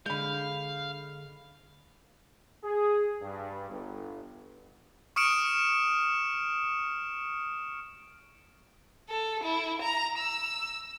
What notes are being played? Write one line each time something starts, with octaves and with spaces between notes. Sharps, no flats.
D3 G#3 F5 B5 G6
G#4
G2
G1
C#6 D#6 F6 C#7 D7 E7
A4
E4
A#5
E6